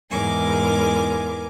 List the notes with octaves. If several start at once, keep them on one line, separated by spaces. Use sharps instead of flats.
E2 G#2 A#4 G#5 D6